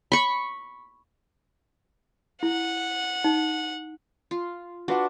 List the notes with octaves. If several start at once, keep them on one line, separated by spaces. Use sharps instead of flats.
B5 C#6
E4 F#5
D#4
F4
D4 F4 F#4 B4 F#5